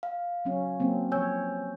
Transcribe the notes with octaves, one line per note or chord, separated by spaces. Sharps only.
F5
F#3 C#4
F#3 A#3 C4
F3 C#5 G#5 E6 G6